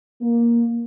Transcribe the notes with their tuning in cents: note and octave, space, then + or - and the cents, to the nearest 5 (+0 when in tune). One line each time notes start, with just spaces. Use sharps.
A#3 +10